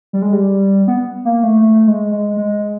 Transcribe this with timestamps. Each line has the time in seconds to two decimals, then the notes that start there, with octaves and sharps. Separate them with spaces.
0.13 G3
0.22 G#3
0.33 G3
0.88 B3
1.25 A#3
1.43 A3
1.62 A3
1.88 G#3
2.11 G#3
2.37 G#3